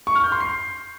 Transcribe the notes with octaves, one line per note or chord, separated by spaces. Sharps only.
C#6
F6
G6
C6
C7